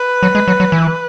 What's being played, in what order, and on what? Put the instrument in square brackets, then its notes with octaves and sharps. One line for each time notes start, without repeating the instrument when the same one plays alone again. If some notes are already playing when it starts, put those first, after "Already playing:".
Already playing: [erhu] B4
[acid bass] F#3
G#3
F#3
F#3
E3